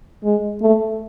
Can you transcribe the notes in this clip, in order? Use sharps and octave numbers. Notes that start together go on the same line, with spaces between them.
G#3
A3